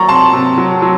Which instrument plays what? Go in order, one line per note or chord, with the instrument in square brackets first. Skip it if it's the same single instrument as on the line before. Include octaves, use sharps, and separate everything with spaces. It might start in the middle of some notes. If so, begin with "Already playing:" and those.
Already playing: [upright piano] F#3 A#3 A#5 C#6 A6
C3 A5 C6
C3
F#3
F#3